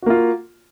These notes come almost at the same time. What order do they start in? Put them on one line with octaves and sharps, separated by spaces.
F#4 A#3 F4